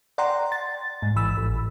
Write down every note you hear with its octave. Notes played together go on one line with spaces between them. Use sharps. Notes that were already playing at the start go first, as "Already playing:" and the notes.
D5 F#5 G5 A#5 C6
A6
G#2
A1 E3 B5 E6
A1